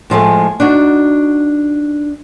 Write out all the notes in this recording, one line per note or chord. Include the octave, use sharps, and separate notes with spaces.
A2 F3 G#3 A3
D4 D#4 F#4